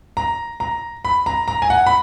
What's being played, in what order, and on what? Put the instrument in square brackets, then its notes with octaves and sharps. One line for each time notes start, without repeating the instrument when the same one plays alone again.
[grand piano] A#5
A#5
B5
A#5
A#5
G#5
F#5
B5